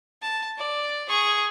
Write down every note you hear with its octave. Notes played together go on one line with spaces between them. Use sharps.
A5
D5
G#4 C#6